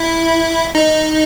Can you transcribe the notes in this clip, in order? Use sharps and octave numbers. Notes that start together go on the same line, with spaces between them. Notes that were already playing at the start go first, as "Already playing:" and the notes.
Already playing: E4
D#4